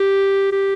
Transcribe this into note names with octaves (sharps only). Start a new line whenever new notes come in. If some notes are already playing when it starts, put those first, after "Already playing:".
Already playing: G4
G4